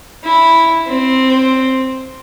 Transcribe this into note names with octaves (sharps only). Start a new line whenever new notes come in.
E4
C4